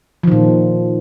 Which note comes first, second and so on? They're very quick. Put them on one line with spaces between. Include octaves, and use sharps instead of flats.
F3 D#3 A#2